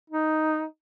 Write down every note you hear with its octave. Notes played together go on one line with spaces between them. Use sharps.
D#4